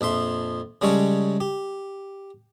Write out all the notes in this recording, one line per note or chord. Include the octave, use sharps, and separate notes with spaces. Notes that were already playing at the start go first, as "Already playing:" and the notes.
A#1 F2 E5 C6
C#3 G3 G#3 C#4 A4 C#5
G4